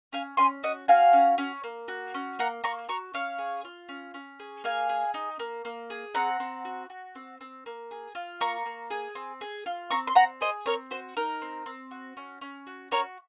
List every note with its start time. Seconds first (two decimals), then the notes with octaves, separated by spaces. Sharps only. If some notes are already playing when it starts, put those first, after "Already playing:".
0.13 C#4 F5 G#5
0.37 C#4 G#5 C6
0.63 F#4 D#5 F#5
0.88 F#4 F5 G#5
1.13 C#4
1.38 C#4
1.64 A#3
1.88 F#4
2.14 C#4
2.39 A#3 F#5 A#5
2.64 A#3 A#5 C#6
2.89 F#4 A#5 C#6
3.14 C#4 C#5 F5
3.38 G#4
3.65 F4
3.89 C#4
4.14 C#4
4.40 G#4
4.64 A#3 F5 G#5
4.89 G#4
5.14 D#4
5.39 A#3
5.65 A#3
5.90 G#4
6.15 C4 F#5 A#5
6.40 C4
6.65 F#4
6.90 F#4
7.15 C4
7.41 C4
7.66 A#3
7.91 G#4
8.15 F4
8.41 A#3 A#5 C#6
8.66 A#3
8.90 G#4
9.15 C4
9.41 G#4
9.66 F4
9.91 C4 A#5 C#6
10.07 C6
10.15 C4 F#5 A#5
10.41 G#4 C5 D#5
10.66 C4 A#4 C#5
10.91 F#4 C5
11.17 D#4 A#4
11.42 C4
11.66 C4
11.91 F#4
12.17 C#4
12.41 C#4
12.67 F#4
12.91 F#4 A#4 C#5